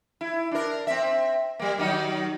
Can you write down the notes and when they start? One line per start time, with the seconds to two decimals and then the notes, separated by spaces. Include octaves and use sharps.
0.21 E4
0.51 D4 A#4
0.87 C4 E5
1.59 G3 A#3
1.78 D#3 F#3 D#4